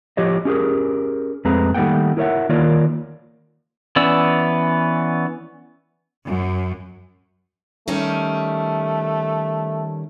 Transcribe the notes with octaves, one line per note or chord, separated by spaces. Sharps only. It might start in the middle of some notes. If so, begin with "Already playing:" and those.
F3 G4 C#5 D#5
C#4 G4 G#4 A#4
F2 G#3 A3 C4 B4 A#5
D#3 G3 A3 A#3 F#5 G5
E4 A#4 C#5 E5 F#5
D#3 A#3 F4 A#4 C#5 D5
E3 B3 C#4 D5 E6
F#2
D#3 G3 A3 C#4